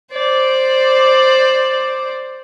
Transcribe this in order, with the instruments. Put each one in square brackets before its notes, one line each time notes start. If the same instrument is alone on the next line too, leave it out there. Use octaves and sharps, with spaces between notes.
[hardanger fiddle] C5 D5